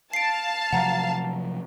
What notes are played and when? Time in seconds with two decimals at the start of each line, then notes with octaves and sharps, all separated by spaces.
0.13 F5 A5 C7 D7
0.73 C3 F3 F#3 F#5 A#5